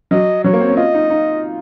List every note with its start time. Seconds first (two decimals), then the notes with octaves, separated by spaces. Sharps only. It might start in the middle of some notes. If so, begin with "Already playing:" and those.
0.11 F#3 D#5
0.44 F#3 C#5
0.53 A#3
0.60 C4
0.69 C#4
0.77 F4 D#5
0.94 D#4
1.10 D#4